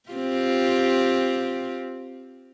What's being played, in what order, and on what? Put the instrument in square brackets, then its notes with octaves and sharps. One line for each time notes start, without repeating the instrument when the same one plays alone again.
[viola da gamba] C4 F4 G4